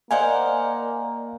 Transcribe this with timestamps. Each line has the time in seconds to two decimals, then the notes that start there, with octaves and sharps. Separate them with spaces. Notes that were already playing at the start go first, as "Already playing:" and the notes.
0.11 A#3 A#4 C5 D5 D#5 F5 F#5 G#5